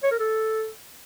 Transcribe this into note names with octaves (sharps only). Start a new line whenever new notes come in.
C#5
A#4
A4